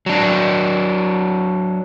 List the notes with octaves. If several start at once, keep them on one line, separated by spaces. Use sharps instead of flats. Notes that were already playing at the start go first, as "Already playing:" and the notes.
F#3 D4